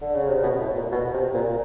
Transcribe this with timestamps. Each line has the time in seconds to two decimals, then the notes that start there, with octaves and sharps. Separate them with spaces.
0.01 D3
0.15 C#3
0.28 C3
0.43 B2
0.59 A2
0.75 A#2
0.92 B2
1.13 C3
1.34 A#2
1.48 A#2